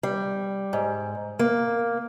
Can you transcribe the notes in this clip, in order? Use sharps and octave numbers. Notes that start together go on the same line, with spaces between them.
G3
G#2
A#3